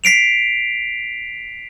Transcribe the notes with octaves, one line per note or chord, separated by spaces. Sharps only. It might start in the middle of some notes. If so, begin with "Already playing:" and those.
B6 C7 D7 F7